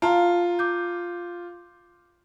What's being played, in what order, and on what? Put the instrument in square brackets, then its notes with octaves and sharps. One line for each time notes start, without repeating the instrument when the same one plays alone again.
[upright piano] F4 [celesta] A5 A#5
[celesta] D6 G6